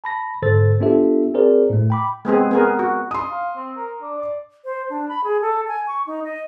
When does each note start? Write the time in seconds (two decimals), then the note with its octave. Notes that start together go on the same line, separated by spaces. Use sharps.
0.04 A5 B5 A#6
0.42 G#2 D3 A4 C5 E6 A6
0.80 B3 D4 F4 G4 A4 E5
1.34 C4 F#4 G#4 A#4 C5 D5
1.70 A2 A3
1.90 G5 B5 D6
2.25 G#3 B3 C4 G#4
2.51 B3 G#4 A#4
2.79 F#4
3.11 C6 D#6
3.30 F5
3.56 C4
3.76 A#4
4.02 D4
4.17 D5
4.65 C5
4.90 D4
5.08 B5
5.24 G#4
5.42 A4
5.68 G#5
5.87 C#6
6.07 D#4
6.24 D#5